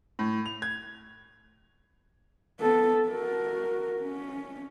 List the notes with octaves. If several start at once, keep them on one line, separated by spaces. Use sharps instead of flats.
A2
F7
G#6
B3 A4
F#4 A#4
C#4